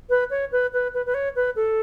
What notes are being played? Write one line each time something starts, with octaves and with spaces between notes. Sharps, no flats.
B4
C#5
B4
B4
B4
B4
C#5
B4
A4